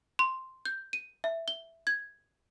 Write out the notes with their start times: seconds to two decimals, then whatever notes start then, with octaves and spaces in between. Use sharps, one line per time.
0.19 C6
0.65 G6
0.93 D#7
1.24 E5
1.48 G7
1.87 G#6